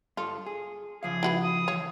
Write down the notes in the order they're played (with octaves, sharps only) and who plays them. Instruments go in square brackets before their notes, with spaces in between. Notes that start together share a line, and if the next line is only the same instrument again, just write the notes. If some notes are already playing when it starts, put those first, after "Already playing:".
[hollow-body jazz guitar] G2 A4 [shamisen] F4
[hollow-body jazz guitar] G#4
[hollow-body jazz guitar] C#3 F3 F5 [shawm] G#4
[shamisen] E4 F#4 B4
[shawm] D#6
[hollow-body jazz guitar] E3 F5 [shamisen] C#5